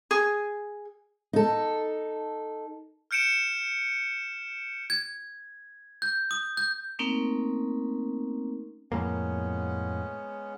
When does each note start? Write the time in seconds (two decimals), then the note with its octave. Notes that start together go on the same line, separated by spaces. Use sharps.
0.11 G#4
1.33 D#4 A4
3.11 F6 G6 C#7 D7 E7
4.90 G#6
6.02 G6
6.31 D#6
6.57 G6
6.99 A3 A#3 C4 C#4 D#4 A#4
8.92 F2 A2 G#3 A#3 B3 C#4